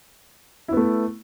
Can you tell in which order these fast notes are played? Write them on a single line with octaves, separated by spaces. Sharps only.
E4 B3 A3